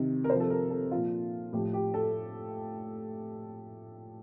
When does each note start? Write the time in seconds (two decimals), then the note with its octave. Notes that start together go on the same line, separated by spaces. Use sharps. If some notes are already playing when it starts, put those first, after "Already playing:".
Already playing: C3 D#3
0.24 A#4
0.30 C3 F3 C5
0.40 A4
0.50 A#4
0.70 A4
0.91 A#2 F3 F4
1.53 A2 F3 G4
1.73 G4
1.94 A4